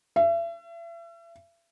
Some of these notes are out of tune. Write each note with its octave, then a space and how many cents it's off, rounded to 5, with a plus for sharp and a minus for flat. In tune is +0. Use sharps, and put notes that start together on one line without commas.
E5 +40